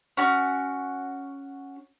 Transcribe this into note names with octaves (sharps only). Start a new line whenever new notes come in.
C#4 F#4